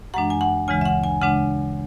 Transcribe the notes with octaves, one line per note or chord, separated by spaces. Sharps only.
F#2 E3 G#3 D4 F#5
G#5
F#5
D2 C#3 E3 G#3 G#5
E5
F#5
G#5
C#3 G#3 D4 F#5